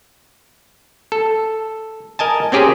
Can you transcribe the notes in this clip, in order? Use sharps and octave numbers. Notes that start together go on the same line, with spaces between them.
A4
A#4 D#5 G#5 A5
C4 C#4 G4 G#4 A#4 C5